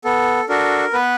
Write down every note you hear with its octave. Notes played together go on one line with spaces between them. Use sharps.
B3 A4
D4 F#4 A4 A#4
B3 B4